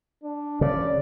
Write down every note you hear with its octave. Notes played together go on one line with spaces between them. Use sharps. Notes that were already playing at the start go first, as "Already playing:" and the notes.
D4
C#3 D5